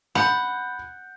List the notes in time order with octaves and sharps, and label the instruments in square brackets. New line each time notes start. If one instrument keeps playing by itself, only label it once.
[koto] F#5 [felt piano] B5 G6